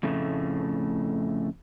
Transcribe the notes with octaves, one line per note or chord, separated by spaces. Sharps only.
F2 A2 C#3 A3